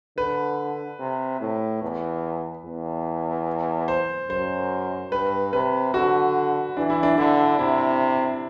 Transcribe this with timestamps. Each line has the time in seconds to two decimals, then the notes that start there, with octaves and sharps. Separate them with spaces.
0.17 D3 B4
1.00 C3
1.41 A2
1.82 E2
2.65 E2
3.88 C5
4.29 F#2 C5
5.12 G2 B4
5.53 C3 B4
5.94 D3 F#4
6.77 E3 D4
6.90 E4
7.03 D4
7.18 D3 E4
7.59 C3 E4